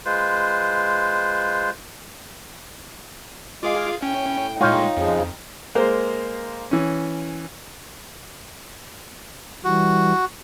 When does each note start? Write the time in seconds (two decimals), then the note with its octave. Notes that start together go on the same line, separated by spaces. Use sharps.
0.06 G#3 F4 B4 C5
3.63 G#3 F4 G#4 F5 D6
4.02 A2 C#4 G5
4.61 A#2 G#3 D#4 F4 C#5 G5
4.97 F2 C#3 F3 G#3
5.75 G#3 A#3 A#4 C5
6.71 E3 C#4
9.64 E3 G3 F#4